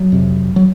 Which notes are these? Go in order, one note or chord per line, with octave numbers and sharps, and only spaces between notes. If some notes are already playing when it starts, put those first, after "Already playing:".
Already playing: F#3
F2 C3
F#3